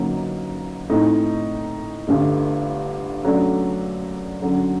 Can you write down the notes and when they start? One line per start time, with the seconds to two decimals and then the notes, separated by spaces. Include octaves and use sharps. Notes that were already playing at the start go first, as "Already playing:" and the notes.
Already playing: G1 F#2 F#3 A#3 D#4
0.90 A2 A3 C4 D#4
2.07 G1 G2 D3 A3
3.25 F#2 F#3 A3 D4
4.42 F#2 D3 F#3